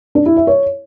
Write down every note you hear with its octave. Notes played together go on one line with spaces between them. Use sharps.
D4
E4
E5
C#5